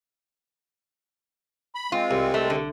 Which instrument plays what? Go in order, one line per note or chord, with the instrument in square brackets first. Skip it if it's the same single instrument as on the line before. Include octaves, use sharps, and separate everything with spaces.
[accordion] B5
[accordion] G#3 C4 [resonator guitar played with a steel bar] F4
[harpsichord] C2
[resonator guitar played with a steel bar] A3
D3